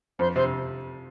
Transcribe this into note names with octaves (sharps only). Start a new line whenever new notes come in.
F2 C5
C3 C5